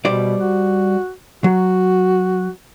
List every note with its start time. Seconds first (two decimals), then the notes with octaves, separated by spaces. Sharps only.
0.05 B2 G3 C5 D5
0.41 F#4
1.44 F#3 F#4